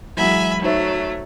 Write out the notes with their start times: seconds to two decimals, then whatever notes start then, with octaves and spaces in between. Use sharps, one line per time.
0.17 E3 F#3 G#3 E5 G#5 B5
0.63 F#3 A3 D#4 C5 E5